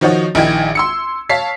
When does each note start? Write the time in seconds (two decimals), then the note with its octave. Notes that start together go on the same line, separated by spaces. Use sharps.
0.01 D#3 F3 D#4 F#4 C#5 D#5
0.35 A#1 D#3 D#4 E4 G5 G#6
0.75 C6 E6 C#7
1.29 C#5 F5 A5 B6 C7